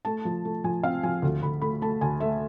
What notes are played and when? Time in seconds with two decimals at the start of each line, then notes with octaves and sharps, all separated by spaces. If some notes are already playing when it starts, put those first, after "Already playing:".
0.05 A3 A5
0.25 F3
0.45 A3
0.64 F3 G#5
0.83 C4 F5
1.03 F3 G#5
1.22 D2
1.42 D2 B5
1.62 A3 B5
1.82 A3 A5
2.01 D2 G#5
2.20 A3 E5